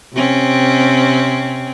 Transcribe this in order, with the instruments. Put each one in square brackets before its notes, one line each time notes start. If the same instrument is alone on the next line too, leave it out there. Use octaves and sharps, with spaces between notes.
[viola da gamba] C3 C4 C#4